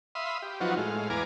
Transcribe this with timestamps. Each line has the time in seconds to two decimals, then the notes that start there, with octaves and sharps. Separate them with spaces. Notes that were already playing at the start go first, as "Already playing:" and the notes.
0.15 E5 F5 B5 C6 D#6
0.42 G4
0.61 F3 F#3 B3 D#4 F4 F#4
0.77 A2 G#3 F5
1.10 E2 B3 F5 G#5 A#5 D6